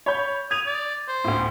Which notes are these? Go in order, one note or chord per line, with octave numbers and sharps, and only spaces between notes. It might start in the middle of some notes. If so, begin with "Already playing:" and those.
C#5 B5 G6
D#6 G#6 F7
D5
C5
D2 A2